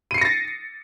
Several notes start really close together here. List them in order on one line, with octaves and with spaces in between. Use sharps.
D#7 C7 C#7 A#6 A6